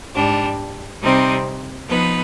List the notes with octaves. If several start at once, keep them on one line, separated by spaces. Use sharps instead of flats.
G#2 G3 D4
C3 G3 C4 D#4
F3 B3 D#4 B4